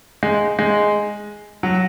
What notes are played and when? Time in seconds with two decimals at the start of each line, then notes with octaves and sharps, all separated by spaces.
0.23 G#3
0.59 G#3
1.63 F#3